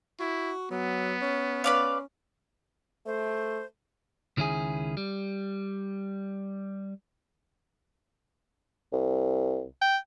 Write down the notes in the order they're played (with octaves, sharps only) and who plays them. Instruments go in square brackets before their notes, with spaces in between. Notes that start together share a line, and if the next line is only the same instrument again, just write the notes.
[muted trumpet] E4 [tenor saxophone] F#4
[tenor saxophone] F#3 [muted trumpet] B3
[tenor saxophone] C#4
[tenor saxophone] C#4 [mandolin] B4 D5 F5
[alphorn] A3 [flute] C5
[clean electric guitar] C#2 D#3 C#4 E4 G#4
G3
[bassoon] C2
[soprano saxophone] G5